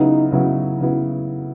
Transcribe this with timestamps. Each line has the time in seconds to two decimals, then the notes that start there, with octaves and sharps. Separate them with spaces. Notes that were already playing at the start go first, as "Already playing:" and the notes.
Already playing: C#3 F#3 B3 D#4 E4
0.32 C#3 F#3 B3 E4
0.81 C#3 F#3 B3 E4